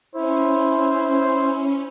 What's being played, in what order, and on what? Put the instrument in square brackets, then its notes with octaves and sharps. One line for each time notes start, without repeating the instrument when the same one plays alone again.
[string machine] C#4 [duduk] E4 [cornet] C5